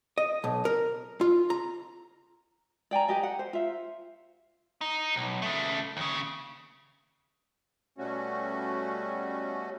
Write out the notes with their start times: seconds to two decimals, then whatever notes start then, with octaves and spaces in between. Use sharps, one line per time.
0.18 D#5
0.44 B1
0.65 A#4
1.21 F4
1.50 A#5
2.91 D5 G5 G#5 A#5
3.08 G4 B4 D#5 G#5
3.23 F#5
3.39 C5
3.53 F4 E5
4.81 D#4
5.16 B1
5.42 C#3 A3
5.97 D#2 C#3
7.98 B2 G3 A3 C#4 F#4